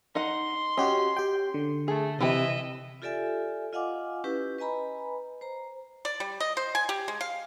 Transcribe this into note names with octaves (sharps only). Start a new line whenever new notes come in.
D#4 D#5 F#5 C6
C#4 F#4 G4 D#5
G4 G5
D3
A3 G#4
C3 E3 E4 D#5 E5 G5
F4 G4 A4 D5 E5 G#5
F4 D#5 F5 F#5 G#5 D6
C#4 E4 G4 B4
B4 D#5 G#5 A#5 B5
C5 A#5
D5
G3
D#5
C5
G#5
G4
G#3
F5